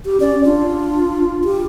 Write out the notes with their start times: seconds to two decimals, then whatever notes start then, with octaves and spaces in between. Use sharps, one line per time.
0.05 G4
0.20 C#4 D5
0.44 D4 F4
1.44 G4